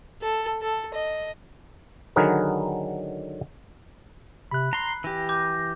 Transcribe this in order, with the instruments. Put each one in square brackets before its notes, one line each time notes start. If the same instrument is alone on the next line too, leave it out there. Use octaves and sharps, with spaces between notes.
[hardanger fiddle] A4
A4
D#5
[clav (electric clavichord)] D3 D#3 F#3 G#4 A#4 B4
[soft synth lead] C3 [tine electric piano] B5 F#6
[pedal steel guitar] A#5 C6 [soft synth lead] C7
[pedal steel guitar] E3 G4 [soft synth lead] A#6
[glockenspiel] D6 G6